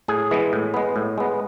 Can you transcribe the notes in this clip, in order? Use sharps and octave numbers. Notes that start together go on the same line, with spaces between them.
A2 G#4
E3 G#3 B3
A2
G#3 B3
A2
G#3 B3